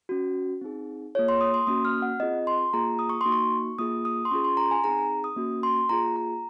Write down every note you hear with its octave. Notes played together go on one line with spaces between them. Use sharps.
C#4 F#4
C4 D#4 G#4
A#3 F4 G#4 C#5
C6
D#6
C6
A#3 C#4 F#4 D#6
F6
F#5
C4 F4 G#4 D#5
C6
A#3 F4 G#4 A#5
D#6
C#6
A#3 D#4 F#4 C6
C#6
A#3 F4 G#4 D#6
D#6
C6
C#4 F4 G#4 C#6
C6
A#5
G#5
C4 D#4 G#4 A#5
D#6
A#3 C#4 F#4
C6
A#3 F4 G#4 A#5
A#5